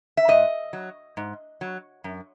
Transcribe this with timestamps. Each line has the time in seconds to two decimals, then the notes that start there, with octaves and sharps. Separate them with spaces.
0.17 E5
0.28 G#2 D#5
0.73 F#3
1.17 G#2
1.61 F#3
2.04 F#2